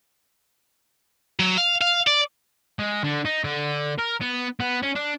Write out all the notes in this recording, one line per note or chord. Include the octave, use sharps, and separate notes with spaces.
F#3
F5
F5
D5
G#3
D3
D#4
D3
A#4
B3
B3
C#4
D4